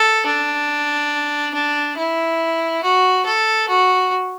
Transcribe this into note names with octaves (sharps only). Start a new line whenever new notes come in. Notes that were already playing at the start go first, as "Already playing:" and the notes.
Already playing: A4
D4
D4
E4
F#4
A4
F#4